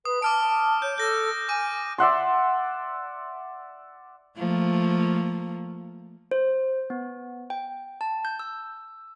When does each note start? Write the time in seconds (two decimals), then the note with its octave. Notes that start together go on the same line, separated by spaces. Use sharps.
0.05 B4 D#6
0.22 A5 D6 F6 D7
0.82 C#5 G6
0.98 A4 G6 A#6
1.49 G#5 D6 D#7
1.98 D5 E5 F#5 C6
4.37 F3 A3 A#3
6.31 C5
6.90 B3
7.50 G5
8.01 A5
8.25 G6
8.39 E6